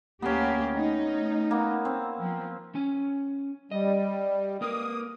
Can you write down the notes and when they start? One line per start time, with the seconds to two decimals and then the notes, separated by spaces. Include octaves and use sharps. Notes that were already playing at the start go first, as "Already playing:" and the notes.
0.22 D2 A#3 B3 C#4 G4
0.74 A3 D#4
1.51 A#3 B3
1.85 C4
2.20 F3
2.75 C#4 G#5
3.71 G3 D#5
4.61 A#3 A#4 B4 D#6